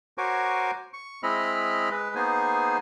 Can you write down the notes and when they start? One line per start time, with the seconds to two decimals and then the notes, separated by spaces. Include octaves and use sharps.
0.18 F#4 A#4 C5 C#5 G#5 D6
0.93 C#6
1.23 G#3 C4 E4 D#5 B5 F6
1.91 G#3 B4
2.15 A#3 B3 D#4 G#4 C5 G#5